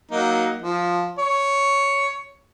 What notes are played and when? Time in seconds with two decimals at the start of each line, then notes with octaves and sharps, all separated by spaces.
0.11 F#3 A#3 D#4
0.62 F3
1.18 C#5